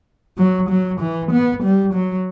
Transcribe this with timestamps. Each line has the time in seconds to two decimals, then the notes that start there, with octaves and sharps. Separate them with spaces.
0.38 F#3
0.70 F#3
1.01 E3
1.32 B3
1.63 G3
1.94 F#3